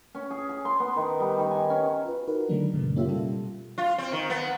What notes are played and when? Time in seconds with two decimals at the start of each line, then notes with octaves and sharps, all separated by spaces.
0.15 C#4
0.30 G#4
0.49 G#4
0.65 C6
0.80 B3
0.96 D#3
1.20 G3
1.39 D#3
1.51 G#5
1.70 C#4
2.06 F4 B4
2.28 D#4 F#4 A#4 B4
2.49 D3 D#3 F#3 G#3 A3 D4
2.73 F#2 A#2 C#3 G#3
2.96 A#3 C#4 F4 G4 E5
3.08 B2 G3 F4 A4
3.78 F4
3.98 C4
4.12 D#3
4.30 B3